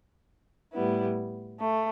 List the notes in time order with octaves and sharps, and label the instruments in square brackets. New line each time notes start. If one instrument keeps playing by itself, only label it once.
[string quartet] A2 G3 B3 E4
A3